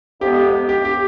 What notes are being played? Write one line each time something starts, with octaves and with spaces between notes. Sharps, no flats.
F2 C3 F3 G#3 B3 G4
G4
G4